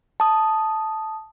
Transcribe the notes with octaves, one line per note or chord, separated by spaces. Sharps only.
A5 D#6